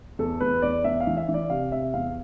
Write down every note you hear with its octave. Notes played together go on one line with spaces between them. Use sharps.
E2 A4
E2 B4
E2 D5
E2 E5
F5
E3
E5
E3
D5
C3 F5
C3 E5
E2 F5